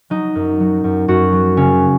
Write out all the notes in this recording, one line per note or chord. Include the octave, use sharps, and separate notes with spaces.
F#3 D#4
F#2
F#3
F#2
F#2 F#4
F#3
C#3 C#4